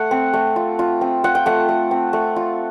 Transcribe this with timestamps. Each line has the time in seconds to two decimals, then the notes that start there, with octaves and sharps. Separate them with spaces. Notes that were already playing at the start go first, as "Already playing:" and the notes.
Already playing: A3 F#5
0.11 C4
0.34 A3
0.56 F4
0.79 F4
1.01 C4
1.24 F4 F#5
1.35 G5
1.46 A3 F#5
1.69 A3
1.91 C4
2.13 A3
2.36 F4